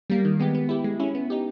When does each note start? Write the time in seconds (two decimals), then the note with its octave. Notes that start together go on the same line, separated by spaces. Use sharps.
0.10 G3 A#3
0.25 D#3
0.40 G#3 B3 G4
0.55 B3
0.69 E4 G4
0.84 G#3
1.00 C#4 E4
1.15 B3
1.30 D#4 G4